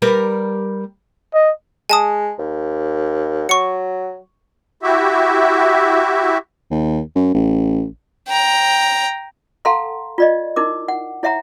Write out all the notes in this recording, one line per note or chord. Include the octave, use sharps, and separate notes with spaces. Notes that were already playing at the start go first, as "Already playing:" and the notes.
G3 A#4 B4
D#5
G#3 G#5 A5 D#6
D#2
F#3 C#6 C#7
E4 F#4 G4 E5
D#2
F#2
A1
G5 A#5
A4 F5 F#5 A5 A#5 C6
F4 D5 D#5
D#4 E4 A#4 D6
F#5
E4 C#5 E5 F#5 A#5